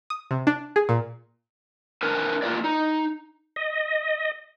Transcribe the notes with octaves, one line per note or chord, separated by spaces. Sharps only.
D#6
C3
D4
G#4
A#2
D4 A#4 B4 G#5
A#3 F4 B4 D5
D#4
D#5